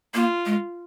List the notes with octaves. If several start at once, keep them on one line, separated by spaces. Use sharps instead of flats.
A#3 F4
G#3